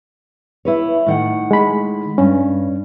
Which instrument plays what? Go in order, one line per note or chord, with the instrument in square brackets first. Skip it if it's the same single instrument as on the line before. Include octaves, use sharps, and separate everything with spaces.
[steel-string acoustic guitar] E4 B4 C#5
A2 D#3 F#5
[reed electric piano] G#3 B5
[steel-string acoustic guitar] G2 [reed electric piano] C#4